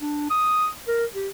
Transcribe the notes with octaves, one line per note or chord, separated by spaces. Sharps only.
D4
D#6
A#4
G4